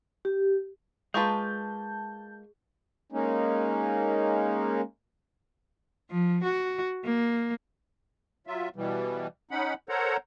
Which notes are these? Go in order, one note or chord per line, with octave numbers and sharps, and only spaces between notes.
G4
G#3 A#3 F4 G#4 B4 A5 C#6 G6
G#3 A#3 C#4 D#4
F3
F#4
A#3
F#3 F4 E5
B2 E3 G3
C#4 D#4 F#5 B5
A4 A#4 C5 C#5 F#5 A#5